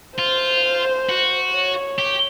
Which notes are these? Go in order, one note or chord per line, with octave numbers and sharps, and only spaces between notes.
F4 C5
F#4
C#5
G4